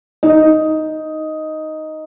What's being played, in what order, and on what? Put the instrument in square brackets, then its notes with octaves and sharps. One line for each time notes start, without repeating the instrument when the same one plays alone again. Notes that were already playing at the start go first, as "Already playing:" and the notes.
[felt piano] D#4